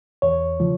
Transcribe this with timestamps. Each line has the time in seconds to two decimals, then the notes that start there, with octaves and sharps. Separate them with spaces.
0.22 E2 C#5
0.60 C#3 F3